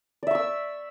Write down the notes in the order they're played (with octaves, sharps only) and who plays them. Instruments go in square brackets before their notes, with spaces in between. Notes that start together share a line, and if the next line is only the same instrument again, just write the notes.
[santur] D5
E5
C#6
E6